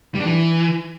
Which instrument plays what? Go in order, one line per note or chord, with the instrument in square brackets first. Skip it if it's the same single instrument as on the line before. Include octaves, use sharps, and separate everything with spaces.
[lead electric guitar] G3
D4
E3